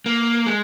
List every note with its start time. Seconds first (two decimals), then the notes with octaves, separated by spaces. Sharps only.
0.06 A#3
0.46 G#3